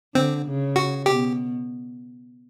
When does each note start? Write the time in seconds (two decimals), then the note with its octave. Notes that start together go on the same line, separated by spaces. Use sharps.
0.14 D3 C4
0.46 C#3
0.76 F#4
1.06 B2 G4